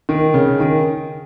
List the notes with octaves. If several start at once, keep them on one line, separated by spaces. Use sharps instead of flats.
D#3
C#3
D#3